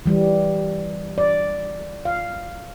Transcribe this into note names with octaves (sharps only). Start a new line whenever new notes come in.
E3 G3
D5
F5